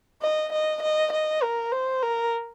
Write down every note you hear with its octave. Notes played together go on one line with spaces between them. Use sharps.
D#5
D#5
D#5
D#5
A#4
C5
A#4